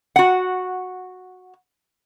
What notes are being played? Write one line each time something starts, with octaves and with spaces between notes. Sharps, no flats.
F#4 F#5